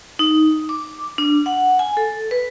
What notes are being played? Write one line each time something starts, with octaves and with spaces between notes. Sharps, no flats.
D#4
D6
D4
F#5
G#5
A4
B4